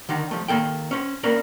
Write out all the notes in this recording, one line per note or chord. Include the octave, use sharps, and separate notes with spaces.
D3 D#3 D#4
F3 A3
D#3 A#3 A4 G5
C#4 C5
A#3 C#4 A#4 B4 D5